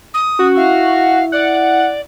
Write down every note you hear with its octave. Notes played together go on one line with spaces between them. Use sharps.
D#6
C#4 F#4
E4 E5 F5
D5 F#5